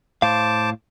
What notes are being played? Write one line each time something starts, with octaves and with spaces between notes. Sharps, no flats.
A2 C5 F5 A5 D6